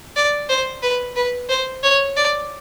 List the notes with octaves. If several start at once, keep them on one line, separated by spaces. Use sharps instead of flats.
D5
C5
B4
B4
C5
C#5
D5